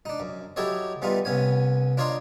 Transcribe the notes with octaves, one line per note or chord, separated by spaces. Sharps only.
D4 D#4
F#2
F#3 E4 G4 A4 C#5 D#5
E3 G3 B3 D#4 F4
C2 B3 C#4 G#5
D4 F4 C#5 D#5 A#5 C6